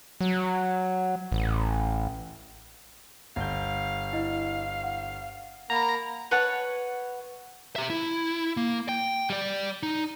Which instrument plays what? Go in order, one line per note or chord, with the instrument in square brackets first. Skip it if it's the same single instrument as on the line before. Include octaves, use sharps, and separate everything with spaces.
[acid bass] F#3
A1
[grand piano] G1 G6 [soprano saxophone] F5
[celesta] E4 D#5
F#5
[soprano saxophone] A#3 [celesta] F#5 B5 [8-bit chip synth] A#5
[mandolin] B4 C#5 F#5 A5
[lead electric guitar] G4 E5
E4
A#3
G5
G3 D5
D#4